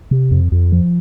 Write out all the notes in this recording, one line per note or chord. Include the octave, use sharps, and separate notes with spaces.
C3
F2
F2
F3